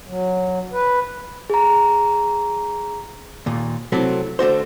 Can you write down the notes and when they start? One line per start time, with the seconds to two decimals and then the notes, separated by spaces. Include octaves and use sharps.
0.07 F#3
0.72 B4
1.50 G#4 A#5
3.46 D#2 A#2
3.92 C3 F#3 A3 C4 E4
4.39 D3 A3 F#4 C5